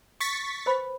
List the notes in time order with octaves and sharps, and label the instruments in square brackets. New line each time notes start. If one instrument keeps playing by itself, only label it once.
[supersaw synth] C#6 A6 B6
[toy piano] B4 C5 B5